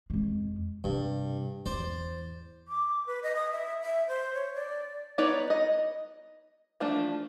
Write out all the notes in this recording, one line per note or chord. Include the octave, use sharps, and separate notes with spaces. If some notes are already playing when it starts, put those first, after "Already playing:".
F2 G#3
G2 C3
E2 C5 D5
D6
B4
D#5
D#6
E5
E5
C5
C#5
D5
B3 D#4 B4 C#5 D5
D#5
E3 F3 A3 D4